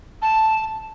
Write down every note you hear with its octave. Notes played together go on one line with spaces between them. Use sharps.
A5